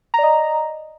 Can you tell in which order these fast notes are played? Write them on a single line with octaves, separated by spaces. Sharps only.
A#5 D5 D#5